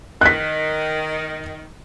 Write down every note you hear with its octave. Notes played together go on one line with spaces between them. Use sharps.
D#3 F#6 B6